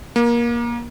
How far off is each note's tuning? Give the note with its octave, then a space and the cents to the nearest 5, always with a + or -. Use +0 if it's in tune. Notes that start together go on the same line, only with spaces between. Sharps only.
A#3 +25